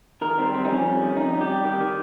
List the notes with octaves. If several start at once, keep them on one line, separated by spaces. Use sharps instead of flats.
D#3 A#4
G3 C4
G3 C4
D#4
F2 C#4
G3
D#3
F2 D#4
G3
G4
G3
D#3 G4
D#3